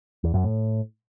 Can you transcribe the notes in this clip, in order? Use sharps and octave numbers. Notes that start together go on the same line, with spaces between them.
E2
F#2
A2